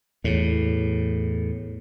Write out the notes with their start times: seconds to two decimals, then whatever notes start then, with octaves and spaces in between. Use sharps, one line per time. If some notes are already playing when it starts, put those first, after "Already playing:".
0.24 E2 A2